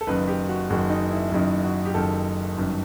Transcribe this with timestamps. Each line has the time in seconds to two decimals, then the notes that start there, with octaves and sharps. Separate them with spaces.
0.01 A4
0.07 F#1 F#2 D#3 B4
0.28 G4
0.49 F#4
0.70 F#1 F#2 D#3 F#4
0.90 D#4
1.11 E4
1.32 F#1 F#2 D#3
1.63 F#4
1.85 G4
1.94 F#1 F#2 D#3 A4
2.57 G1 F#2 D#3